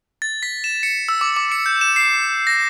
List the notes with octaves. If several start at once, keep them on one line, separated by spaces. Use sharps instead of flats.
A6
B6
E7
C#7
E6
D6
D6
C#7
G6
E7
C7
A#6